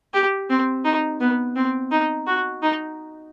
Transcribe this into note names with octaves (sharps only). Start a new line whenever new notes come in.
G4
C4
D#4
B3
C4
D#4
F#4
D#4